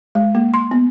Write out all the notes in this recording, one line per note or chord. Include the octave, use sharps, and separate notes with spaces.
G#3
A#3
C6
B3